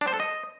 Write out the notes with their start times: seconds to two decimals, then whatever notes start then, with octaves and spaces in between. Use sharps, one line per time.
0.01 D4
0.07 C5
0.14 A4
0.20 D#5